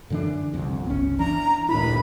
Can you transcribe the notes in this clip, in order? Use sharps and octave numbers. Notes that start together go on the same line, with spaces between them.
F#2 D3 E3 D4
G1 C2 F2
G1 C#2 B3 C#4
E3 D4 A#5
G1 D2 A#2 E4 B5